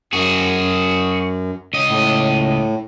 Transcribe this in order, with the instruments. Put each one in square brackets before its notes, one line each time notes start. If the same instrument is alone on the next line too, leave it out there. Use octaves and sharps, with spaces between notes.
[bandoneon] F#2 [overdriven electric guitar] F#4 G#4
[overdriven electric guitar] C#2 D#5
[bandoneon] A2